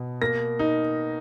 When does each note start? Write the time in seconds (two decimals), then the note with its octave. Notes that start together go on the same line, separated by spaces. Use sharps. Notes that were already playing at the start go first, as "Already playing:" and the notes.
Already playing: B2
0.22 A#3 A#6
0.59 D#4